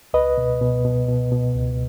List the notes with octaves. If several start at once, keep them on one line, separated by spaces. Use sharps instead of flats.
C#2 B4 D#5
B2
B2
B2
B2
B2
C#2